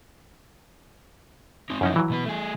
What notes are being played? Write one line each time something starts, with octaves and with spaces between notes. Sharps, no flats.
C4 D#4
F#2 F3 C#4 D#4 E4
E3 F#3
B2 B3 B4
A3 G#4